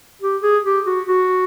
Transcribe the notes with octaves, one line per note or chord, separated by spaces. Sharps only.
G4
G#4
G4
F#4
F#4